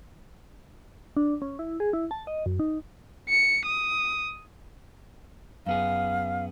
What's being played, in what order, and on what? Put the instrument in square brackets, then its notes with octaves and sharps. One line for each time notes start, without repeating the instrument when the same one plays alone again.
[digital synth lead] D4
C#4
E4
G#4
E4
A5
D#5
F#2
D#4
[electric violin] C#7
D#6
[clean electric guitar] F#2 B3 G#4 [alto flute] F5